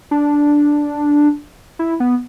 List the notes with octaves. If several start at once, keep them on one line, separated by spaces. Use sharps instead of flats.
D4
E4
B3